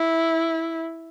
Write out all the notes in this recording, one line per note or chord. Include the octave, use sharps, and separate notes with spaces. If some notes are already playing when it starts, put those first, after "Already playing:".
Already playing: E4